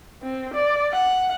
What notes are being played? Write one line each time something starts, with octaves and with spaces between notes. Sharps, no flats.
C4
D5
F#5